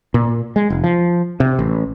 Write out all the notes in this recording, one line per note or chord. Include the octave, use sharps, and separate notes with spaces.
A#2
G#3
F1
F3
C3
A1